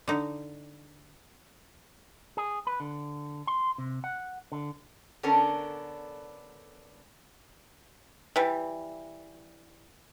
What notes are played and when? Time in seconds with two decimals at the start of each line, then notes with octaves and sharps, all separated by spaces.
0.08 D3 D#4
2.37 G#4
2.67 B4
2.80 D3
3.47 C6
3.78 C3
4.04 F#5
4.52 D3
5.23 D3 B3 C#4 D4 A4 A#4
8.36 E3 G3